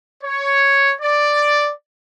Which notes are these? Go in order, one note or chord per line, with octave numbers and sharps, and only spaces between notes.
C#5
D5